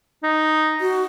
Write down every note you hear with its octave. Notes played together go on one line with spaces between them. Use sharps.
D#4
F#4